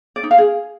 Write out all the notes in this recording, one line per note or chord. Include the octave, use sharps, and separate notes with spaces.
D5
D#4
F5
G#4